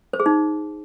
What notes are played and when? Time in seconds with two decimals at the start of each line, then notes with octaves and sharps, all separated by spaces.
0.13 C5
0.20 G#4
0.26 D#4